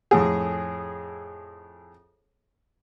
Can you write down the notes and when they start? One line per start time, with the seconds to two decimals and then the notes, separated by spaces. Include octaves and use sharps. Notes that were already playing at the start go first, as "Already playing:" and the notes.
0.11 F2 A2 G#4